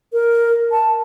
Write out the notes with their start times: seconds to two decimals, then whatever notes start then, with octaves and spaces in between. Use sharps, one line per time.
0.13 A#4
0.72 A5